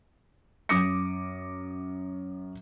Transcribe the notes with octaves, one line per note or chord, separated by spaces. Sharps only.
F#2 D6 D#6 A#6 C#7